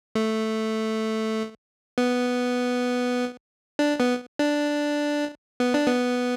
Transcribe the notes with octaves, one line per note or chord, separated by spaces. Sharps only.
A3
B3
D4
B3
D4
B3
D4
B3